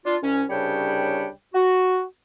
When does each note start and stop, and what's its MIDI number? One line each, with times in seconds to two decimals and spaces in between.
0.05 0.17 62
0.05 0.17 65
0.22 0.44 36
0.22 0.44 61
0.50 1.29 36
0.50 1.29 49
0.50 1.29 55
0.50 1.29 62
0.50 1.29 73
0.50 1.29 79
1.54 2.03 66